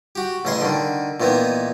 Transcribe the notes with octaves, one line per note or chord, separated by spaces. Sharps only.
F#4 G4
A1 C#3 D#5 G#5 C6 C#6
D3 D#3
A#2 D#3 E3 B3 D#4